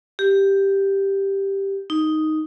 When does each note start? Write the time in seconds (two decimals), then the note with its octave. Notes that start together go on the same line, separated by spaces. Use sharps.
0.19 G4
1.90 D#4